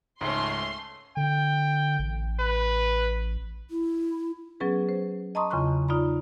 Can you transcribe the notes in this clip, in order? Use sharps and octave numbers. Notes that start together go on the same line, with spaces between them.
C#2 G#2 A3 C#4 C6
D3 G5
A1
B4
E4
F#3 B3 C#4 G#4 B4
C5
D#5 A5 A#5 C6 C#6 D#6
E2 C#3 F4 C6 C#6 F#6
D#4 F4 D5 A#5 B5